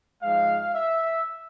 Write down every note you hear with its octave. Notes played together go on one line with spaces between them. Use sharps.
G#2 F3 G#3 F5
E5